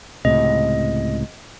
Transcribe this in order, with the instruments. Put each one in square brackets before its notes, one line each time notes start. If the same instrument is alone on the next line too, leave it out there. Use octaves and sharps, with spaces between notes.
[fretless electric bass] C#2 A2 C3 [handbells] D#5